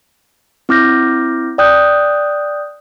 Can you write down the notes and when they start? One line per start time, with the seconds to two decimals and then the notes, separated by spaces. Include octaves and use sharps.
0.69 C4 E4 D6 F6 G6 A#6
1.58 D5 G5 D#6 F#6 G6